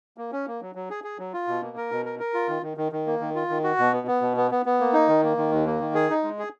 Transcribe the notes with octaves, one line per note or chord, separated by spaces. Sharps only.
A#3
C#4
A#3
F#3
F#3
G#4
G#4
F#3
F4
B2
A#3
A#4
B2
A#4
A#4
F4
D#3
D#3
D#3
D#3
A#3
D#3
F4
D#3
F#4
B2
B3
B3
B2
B3
B3
B3
A#3
D#4
D#3
A#3
D#3
D#2
A#3
D#3
G#4
D#4
G#3
G#4